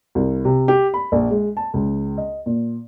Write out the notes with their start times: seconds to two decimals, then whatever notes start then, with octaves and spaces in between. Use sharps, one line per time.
0.15 C2
0.45 C3
0.68 G4
0.94 B5
1.12 A#1
1.31 G#3
1.57 A5
1.74 C#2
2.18 D#5
2.46 A#2